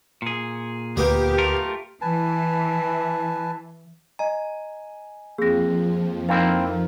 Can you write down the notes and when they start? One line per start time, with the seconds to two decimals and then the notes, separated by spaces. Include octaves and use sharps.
0.22 A#2 G#4
0.97 D2 A#3 B3 G4
1.38 A3 F4 A#4
2.01 E3 B4 G#5 A5
4.19 D#5 G#5 A#5
5.38 F2 F3 A#3 C4 G#4 A#6
6.29 A#3 C4 D#4 E4 A#4 F5